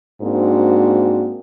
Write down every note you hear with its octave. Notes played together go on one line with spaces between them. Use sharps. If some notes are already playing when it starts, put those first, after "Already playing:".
G#2 A#3 C4 D4 F#4